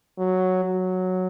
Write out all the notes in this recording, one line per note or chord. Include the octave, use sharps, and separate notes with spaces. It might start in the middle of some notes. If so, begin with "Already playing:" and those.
F#3
F#3